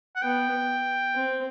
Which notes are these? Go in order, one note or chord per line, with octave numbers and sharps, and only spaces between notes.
F#5
B3 G5
C4